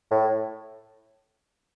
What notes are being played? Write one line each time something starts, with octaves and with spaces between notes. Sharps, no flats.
A2